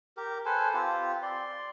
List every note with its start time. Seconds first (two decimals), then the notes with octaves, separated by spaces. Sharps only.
0.17 G4 A#4
0.46 A4 B4 C5 G#5
0.74 C4 F4 G4
1.22 D5 C6